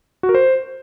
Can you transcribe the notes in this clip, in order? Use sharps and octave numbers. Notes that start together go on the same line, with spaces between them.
F#4
A#4
C5